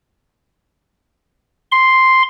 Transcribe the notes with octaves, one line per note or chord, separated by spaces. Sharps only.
C6